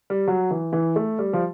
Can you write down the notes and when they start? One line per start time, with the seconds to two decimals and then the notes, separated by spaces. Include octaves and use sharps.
0.10 G3
0.28 F#3
0.51 E3
0.73 E3
0.96 A3
1.19 G3
1.33 F3